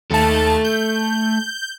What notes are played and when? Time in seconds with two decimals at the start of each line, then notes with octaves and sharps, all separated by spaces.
0.11 D#2 A3 A4 A5
0.64 G6